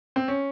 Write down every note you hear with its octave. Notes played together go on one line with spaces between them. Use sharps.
C4
C#4